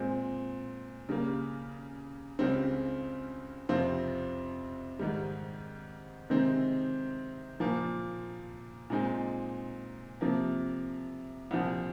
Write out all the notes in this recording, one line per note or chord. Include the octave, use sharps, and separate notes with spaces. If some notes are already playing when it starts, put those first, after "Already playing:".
Already playing: A#2 G#3 C4
C#3 G3 A#3
C#2 C#3 G3 C4
F2 C3 F3 C4 F4
G#2 D#3 G3
C3 D#3 G#3 C4 D#4
A#2 F3 A#3
A#2 G#3 C4 D#4
C3 F3 A#3
C2 A#2 F3